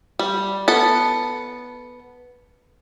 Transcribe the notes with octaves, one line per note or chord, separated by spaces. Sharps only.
G3
B3 A4 A5